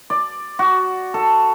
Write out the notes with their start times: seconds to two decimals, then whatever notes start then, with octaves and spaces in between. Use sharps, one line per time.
0.10 D5
0.59 F#4
1.14 A4